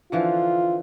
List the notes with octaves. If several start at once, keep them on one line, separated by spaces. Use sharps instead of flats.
D3 E3 F3 F4